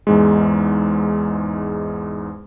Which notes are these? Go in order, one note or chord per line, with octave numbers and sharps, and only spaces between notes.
E2 G#2 G#3